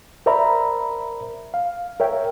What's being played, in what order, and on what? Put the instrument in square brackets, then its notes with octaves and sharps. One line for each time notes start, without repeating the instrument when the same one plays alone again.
[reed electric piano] A#4 C5 D5 E5 A#5 B5
F5
A#4 C#5 E5 G5